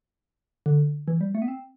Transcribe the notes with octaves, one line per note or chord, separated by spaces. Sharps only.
D3
E3
G3
A3
B3
C4